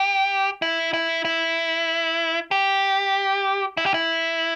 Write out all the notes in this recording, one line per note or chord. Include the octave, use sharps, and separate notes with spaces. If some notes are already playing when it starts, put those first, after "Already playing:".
Already playing: G4
E4
E4
E4
G4
E4
G4
E4